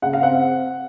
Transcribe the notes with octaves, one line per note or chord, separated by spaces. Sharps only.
C#3 F#5
F5
C4 F#5